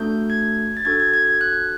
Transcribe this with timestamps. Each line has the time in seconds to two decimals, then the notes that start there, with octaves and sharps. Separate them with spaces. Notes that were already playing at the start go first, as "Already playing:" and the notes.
Already playing: A3 D4 F#4 A4 G6
0.30 G#6
0.77 A6
0.85 D4 F#4 A4 G#6
1.00 G#6
1.14 G#6
1.27 G#6
1.41 F#6